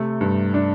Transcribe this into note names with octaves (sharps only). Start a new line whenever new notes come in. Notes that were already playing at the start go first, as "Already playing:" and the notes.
Already playing: C3 A3
G2
D4